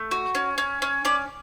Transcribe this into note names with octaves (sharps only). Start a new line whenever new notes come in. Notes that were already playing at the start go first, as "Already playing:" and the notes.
Already playing: A3
F#4
C#4
C#4
C#4
C#4 D5